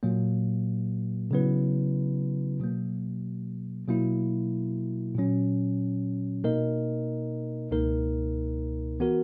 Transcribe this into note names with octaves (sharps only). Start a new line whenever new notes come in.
A#2 F#3 A#3
C#3 F#3 B3 E4 B4
B2 F#3 A#3
B2 F#3 A#3 E4
A#2 F#3 C#4
B2 A#3 D#4 A#4 D#5
C#2 B2 A#3 D#4 A#4
E3 B3 F#4 A#4